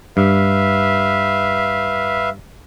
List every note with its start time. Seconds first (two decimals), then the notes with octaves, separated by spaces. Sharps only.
0.17 G2 B4 E5 F5